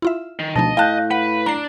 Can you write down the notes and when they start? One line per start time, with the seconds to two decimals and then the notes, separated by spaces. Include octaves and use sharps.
0.02 E4 F4 E5
0.39 D#3
0.56 D2 B2 F3 D#4 D#5 A5
0.77 A2 F5 G5 A5 F#6 G6
1.11 B4 F#5
1.46 D4 A#5 C7